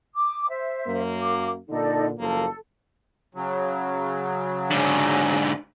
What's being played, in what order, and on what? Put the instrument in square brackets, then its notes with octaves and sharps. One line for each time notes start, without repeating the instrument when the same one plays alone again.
[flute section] D6 D#6
C5 E5
[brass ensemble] F#2 A#3
[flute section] D6
[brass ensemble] A#2 D3 [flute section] D#4 A4 D5
[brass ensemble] F#1 F3 A#3 [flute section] A4
[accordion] C#3 F#3
[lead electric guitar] G#2 D3